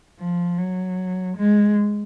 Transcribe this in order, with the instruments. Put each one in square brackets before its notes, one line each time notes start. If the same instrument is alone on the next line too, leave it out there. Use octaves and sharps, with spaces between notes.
[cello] F3
F#3
G#3